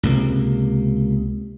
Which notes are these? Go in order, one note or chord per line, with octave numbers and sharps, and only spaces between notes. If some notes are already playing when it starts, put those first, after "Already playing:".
C#2 C3 A#3